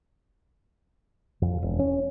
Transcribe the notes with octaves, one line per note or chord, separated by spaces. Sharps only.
F2
E1
C#4